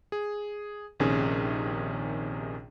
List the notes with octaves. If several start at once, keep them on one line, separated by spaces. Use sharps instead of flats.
G#4
A#1 C3 D#3 C#4 G#4